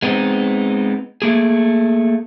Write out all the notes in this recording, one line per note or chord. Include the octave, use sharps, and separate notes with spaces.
G#3 B3 C4 D#4
A3 A#3 G#4